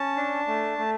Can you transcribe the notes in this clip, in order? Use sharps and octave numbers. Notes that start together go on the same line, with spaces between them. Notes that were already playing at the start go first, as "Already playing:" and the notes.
Already playing: C#4 A5
D4
A3
A3